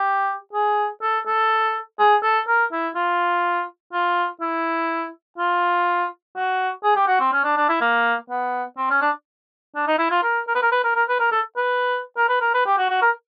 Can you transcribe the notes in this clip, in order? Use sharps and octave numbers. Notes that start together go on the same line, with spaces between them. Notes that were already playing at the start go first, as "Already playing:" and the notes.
Already playing: G4
G#4
A4
A4
G#4
A4
A#4
E4
F4
F4
E4
F4
F#4
G#4
G4
F#4
C4
C#4
D4
D4
E4
A#3
B3
C4
C#4
D4
D4
D#4
E4
F4
A#4
A#4
B4
A#4
B4
A#4
A#4
B4
A#4
A4
B4
A#4
B4
A#4
B4
G4
F#4
F#4
A#4